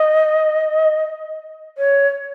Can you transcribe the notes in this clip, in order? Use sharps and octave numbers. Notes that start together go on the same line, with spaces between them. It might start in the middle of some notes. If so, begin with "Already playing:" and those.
Already playing: D#5
C#5